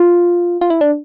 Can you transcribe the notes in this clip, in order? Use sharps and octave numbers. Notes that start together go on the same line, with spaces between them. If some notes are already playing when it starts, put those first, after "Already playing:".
Already playing: F4
F4
E4
D4